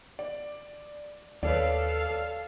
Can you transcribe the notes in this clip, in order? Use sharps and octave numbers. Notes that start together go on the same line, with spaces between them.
D5
D#2 A4 B4 C#5 D5 F5